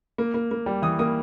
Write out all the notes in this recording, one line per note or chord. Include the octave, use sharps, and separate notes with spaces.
A#3
A#3
A#3
G3
E3 D#6
A#3 D#6